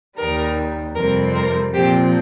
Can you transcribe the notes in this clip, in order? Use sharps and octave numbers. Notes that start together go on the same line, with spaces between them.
D#2 D#3 G3 A#4
F2 C3 G3 C4 A#4
A#4
A#2 F3 C4 G4 C5